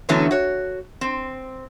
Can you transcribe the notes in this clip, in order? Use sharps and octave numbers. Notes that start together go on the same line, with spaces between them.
D3 E3 F#3 A3 B3 C#4
F#4 C#5
C4